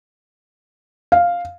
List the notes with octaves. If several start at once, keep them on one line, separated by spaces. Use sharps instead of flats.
F5